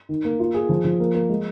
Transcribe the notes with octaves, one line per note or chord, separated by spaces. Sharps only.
D#3
A#3
F4
G#4
F3
F3
A#3
A#3
G#3